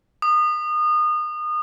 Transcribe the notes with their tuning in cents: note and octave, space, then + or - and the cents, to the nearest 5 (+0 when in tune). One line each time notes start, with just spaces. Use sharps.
D#6 -30